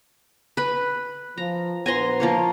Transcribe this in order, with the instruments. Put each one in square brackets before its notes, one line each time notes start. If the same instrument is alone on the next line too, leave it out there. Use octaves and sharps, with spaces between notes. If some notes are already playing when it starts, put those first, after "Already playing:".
[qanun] B4 B5
[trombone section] F3 [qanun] A#5
[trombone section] A#1 B3 C5 [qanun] G#5 A#5 C6
[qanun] F3 A#3 C#5